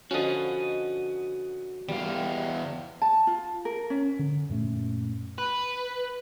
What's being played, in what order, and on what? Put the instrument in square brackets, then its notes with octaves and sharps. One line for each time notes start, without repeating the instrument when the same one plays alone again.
[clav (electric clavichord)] D3 F3 C#4 [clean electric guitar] F#4 D#5
[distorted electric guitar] E2 F5 [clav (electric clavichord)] G3
[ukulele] A5
F4
A#4
C#4
[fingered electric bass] D3
F#2 A#2 A3 C#4
[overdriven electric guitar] B4